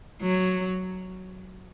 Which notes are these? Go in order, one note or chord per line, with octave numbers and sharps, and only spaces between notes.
F#3